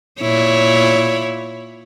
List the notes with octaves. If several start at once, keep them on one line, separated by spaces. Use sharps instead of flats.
A#2 E4 C#5